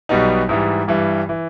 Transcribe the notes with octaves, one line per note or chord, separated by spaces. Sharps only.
B1 B2 G3 B3 D#4
G#2 E3 G3
G2 E3 G3
E3